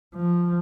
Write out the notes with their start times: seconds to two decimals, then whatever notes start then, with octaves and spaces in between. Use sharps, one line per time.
0.16 F3